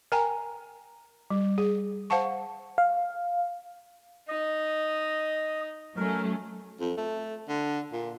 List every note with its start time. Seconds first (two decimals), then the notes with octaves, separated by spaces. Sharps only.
0.12 A#4 G5 G#5 A#5
1.30 G3
1.58 G#4
2.10 C5 F5 F#5 A5 C#6
2.78 F5
4.28 D#4 D#5
5.97 F#3 A3 C#4 A#4
6.80 F2
6.97 A3
7.49 D3
7.92 A#2